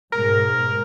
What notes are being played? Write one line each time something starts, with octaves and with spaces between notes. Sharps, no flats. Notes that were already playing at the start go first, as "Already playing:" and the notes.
G#2 B2 G#3 A#4